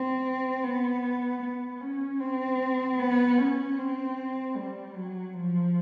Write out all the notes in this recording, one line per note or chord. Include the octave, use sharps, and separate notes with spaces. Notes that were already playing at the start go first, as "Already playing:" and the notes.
Already playing: C4
B3
B3
C#4
C4
B3
C#4
C4
G3
F#3
F3